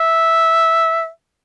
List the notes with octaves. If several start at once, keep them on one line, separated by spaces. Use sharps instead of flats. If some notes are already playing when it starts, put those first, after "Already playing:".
Already playing: E5